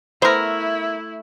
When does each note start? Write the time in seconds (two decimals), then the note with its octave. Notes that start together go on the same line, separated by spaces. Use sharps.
0.22 A3 B3 E4 A#4 C5